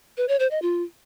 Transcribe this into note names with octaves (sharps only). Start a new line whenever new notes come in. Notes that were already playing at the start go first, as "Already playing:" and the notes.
B4
C#5
C5
D#5
F4